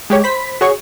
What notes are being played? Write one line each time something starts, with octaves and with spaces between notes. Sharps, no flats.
G#3 G4 C#5
C5 B5 B6
F#4 G#4 C#5 C#6